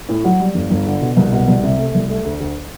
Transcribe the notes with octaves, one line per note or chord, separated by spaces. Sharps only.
A2
F#3
G3
G1
G1
D3
B2
C2
B2
C2
C3
A3
C2
A3
D2
D2